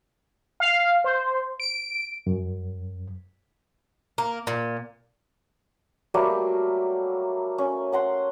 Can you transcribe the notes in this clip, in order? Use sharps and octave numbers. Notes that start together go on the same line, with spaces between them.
F5
C5
D7
F#2
A#3
A#2
F#3 G3 A3 A#3
C#4
C#4 F#5 C6